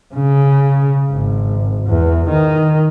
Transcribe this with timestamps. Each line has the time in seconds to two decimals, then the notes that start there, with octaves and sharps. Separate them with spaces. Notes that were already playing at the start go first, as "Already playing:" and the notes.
0.14 C#3
1.12 G#1
1.87 E2
2.29 D#3